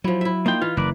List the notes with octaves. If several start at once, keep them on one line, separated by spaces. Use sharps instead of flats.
F3 F#3 E4
E4 E5
A#3 D#4 F4 G5
E3 F4
F#1 A#4 B4 D5